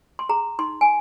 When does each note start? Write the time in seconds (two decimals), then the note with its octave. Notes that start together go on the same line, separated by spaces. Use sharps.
0.19 C6
0.29 G#4 A#5
0.59 D#4 C6
0.81 G#5